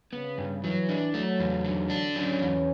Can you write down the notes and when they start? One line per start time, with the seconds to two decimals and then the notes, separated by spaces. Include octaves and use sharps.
0.13 C#3 B3
0.38 G2
0.63 E3 F#3
0.89 D4
1.14 F#3 A3
1.40 E2
1.65 D3
1.90 D4
2.16 F#3 C#4
2.41 E2